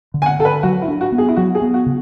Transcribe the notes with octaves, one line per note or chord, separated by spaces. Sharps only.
D3
G#5
F#5
D3 A4
B4
F#3 F#4
E4
D4
F#4
B3
G#4
E4
F#3 F#4
G#4
B3
F#4
C#3